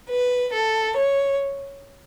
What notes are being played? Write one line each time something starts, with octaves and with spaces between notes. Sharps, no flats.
B4
A4
C#5